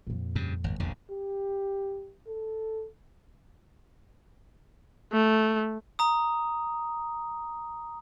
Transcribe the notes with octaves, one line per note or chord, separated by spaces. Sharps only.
F2 A#2
G2 C#3
G#1
E1 A#1 E2 D3
G4
A4
A3
A#5 D#6